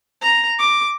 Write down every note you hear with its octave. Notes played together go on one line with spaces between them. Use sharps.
A#5
D6